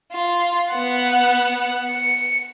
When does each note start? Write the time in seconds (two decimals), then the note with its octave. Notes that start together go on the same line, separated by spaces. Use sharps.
0.12 F4
0.71 B3 F#5
1.84 C#7